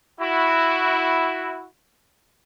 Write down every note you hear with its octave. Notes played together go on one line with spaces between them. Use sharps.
E4 F#4